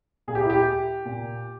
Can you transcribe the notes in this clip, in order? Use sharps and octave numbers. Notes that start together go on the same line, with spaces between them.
A#2 G#4
G4
E4
G4
A#2